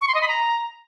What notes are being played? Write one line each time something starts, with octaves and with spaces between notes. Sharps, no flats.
C#6
C6
D#5
B5
A#5